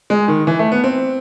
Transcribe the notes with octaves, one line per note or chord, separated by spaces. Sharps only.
G#3
D#3
E3
A3
B3
C4